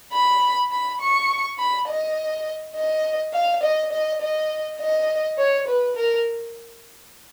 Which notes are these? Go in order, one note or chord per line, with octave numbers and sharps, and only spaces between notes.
B5
B5
C#6
B5
D#5
D#5
F5
D#5
D#5
D#5
D#5
C#5
B4
A#4